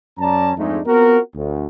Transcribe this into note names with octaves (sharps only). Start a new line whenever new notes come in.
F#2 C#4 D5 A5 A#5
F2 G#2 G#3 A3 D4 D#4
B3 C4 F4 F#4 A#4
D2